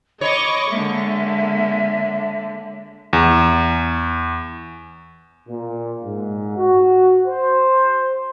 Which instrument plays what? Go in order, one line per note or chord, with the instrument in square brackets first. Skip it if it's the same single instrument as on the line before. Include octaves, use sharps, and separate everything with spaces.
[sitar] C#5 [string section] D#5 C#6 D6 [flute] B5
[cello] D3 G#3 [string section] A#3 [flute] E5
[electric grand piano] E2
[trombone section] A#2
G#2
F#4
C5